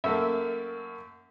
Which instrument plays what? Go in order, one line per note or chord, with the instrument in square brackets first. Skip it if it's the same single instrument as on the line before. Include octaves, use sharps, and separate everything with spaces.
[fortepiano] F#2 A3 A#3 [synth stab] E5